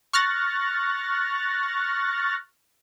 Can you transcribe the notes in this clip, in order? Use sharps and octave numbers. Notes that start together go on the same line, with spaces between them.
C#6 F6 F#6 A6 A#6